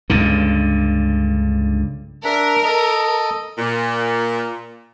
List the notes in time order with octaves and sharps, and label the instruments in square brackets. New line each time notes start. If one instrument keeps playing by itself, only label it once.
[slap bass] C#2 G2 D3
[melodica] D4 E5 [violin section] A#4
[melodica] A4 D#5
[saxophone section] A#2